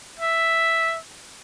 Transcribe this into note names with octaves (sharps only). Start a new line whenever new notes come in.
E5